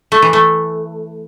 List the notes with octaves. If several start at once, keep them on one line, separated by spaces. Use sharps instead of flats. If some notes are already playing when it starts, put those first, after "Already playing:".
A3
E3
A3